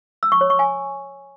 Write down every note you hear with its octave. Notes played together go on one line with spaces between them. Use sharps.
E6
C#6
C#5
C#6
G#5